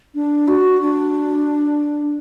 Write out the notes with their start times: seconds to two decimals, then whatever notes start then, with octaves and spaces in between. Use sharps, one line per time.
0.15 D4
0.48 F#4
0.82 D4